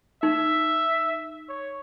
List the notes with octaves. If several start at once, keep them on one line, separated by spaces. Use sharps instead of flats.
D#4 E5
C#5